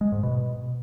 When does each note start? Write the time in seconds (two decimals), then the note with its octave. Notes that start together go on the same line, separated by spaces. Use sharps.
0.01 G#3
0.12 G#2
0.23 B2